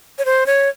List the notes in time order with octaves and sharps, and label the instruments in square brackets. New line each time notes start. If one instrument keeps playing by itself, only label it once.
[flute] C#5
C5
C#5